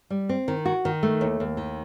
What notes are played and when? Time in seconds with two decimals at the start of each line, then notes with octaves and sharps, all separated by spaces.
0.10 G3
0.29 C4
0.48 D#3
0.65 F#4
0.85 D#3
1.03 A3
1.21 D#2
1.40 D#2
1.57 D#3